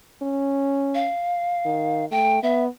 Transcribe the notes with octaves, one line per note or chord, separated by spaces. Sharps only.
C#4
F5
D#3
A3 G5
B3 E5